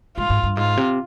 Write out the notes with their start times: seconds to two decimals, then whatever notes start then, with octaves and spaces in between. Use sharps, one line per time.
0.17 G#2 F4
0.30 G#2
0.44 G2
0.57 G#2 F4
0.77 C3